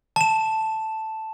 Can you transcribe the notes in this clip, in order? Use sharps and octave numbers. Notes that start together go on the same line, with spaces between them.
A5 E7